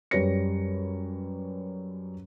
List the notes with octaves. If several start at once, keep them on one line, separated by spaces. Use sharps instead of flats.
F#2 G3 B4 C#5 A#6 C#7